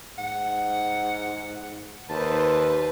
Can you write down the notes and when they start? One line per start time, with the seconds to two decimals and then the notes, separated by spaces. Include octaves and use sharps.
0.18 G#2 F#5
2.09 D#2 B4 C5 A5